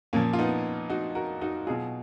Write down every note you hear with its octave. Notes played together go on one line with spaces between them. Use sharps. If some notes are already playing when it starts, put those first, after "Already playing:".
A#2 F3 A#3 C#4
F4
B3 D#4
D#4 F#4
F#4 A#4
D#4 F#4
B2 F#3 F4 G#4